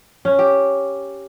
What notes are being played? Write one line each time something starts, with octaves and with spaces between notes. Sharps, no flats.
C#4
G4